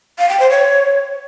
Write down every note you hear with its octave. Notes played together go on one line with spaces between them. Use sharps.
F5
G5
C5
C#5